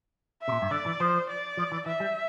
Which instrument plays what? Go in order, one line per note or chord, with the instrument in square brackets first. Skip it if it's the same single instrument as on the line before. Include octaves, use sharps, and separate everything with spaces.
[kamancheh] E5
[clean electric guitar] C3
A#2
G2
[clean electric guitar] D3 [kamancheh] D5
[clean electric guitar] E3
[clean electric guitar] F3 [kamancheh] C5
[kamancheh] D5
[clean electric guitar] F3
E3
[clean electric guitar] E3 [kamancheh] E5
[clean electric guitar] G3